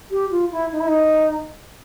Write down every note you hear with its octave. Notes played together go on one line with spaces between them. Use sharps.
G4
F4
E4
D#4
E4
D#4